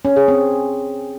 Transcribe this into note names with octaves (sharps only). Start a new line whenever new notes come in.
C#4
G#4
C4